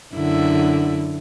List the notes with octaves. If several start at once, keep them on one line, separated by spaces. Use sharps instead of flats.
F#2 D3 E4